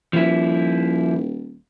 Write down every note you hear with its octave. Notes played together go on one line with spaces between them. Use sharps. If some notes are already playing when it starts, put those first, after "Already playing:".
D#1 F3 E4